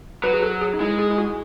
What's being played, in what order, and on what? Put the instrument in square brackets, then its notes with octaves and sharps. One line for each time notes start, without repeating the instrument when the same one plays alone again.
[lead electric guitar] F#3 [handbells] B4
[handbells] G#4
A4
G#4
D#4
[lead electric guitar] G#3 [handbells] E4
[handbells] G#4
E4
F#4